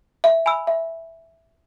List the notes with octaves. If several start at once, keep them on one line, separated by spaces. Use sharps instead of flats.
E5
G#5 B5 E6
E5